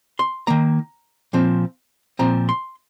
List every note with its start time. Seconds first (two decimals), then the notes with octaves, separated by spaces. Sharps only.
0.19 C6
0.47 D#3 A#3 A#5
1.33 A#2 F3 C4
2.19 A#2 F3 C4 A#5
2.49 C6